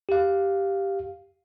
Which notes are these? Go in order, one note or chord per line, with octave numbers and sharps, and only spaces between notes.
G4 F5